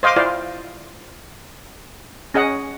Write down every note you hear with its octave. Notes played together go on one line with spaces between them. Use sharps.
C5 D#5 F5 C6 D6
E4 F4 C5 D5 F5
C#4 G#4 D#5 F#5